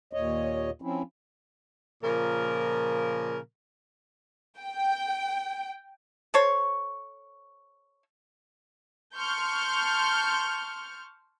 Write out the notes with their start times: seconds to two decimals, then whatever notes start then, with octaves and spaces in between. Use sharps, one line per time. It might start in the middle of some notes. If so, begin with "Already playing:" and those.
0.13 D#2 A#2 C#5 D#5
0.82 F3 C4 C#4 E4
2.04 A#2 C#3 F3 A#4
4.59 G5
6.34 A4 C5 C#5
9.14 A5 C6 C#6 F6 G6